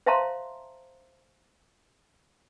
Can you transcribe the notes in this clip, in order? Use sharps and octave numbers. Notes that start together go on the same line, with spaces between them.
C5 E5 F5 A5 A#5 C6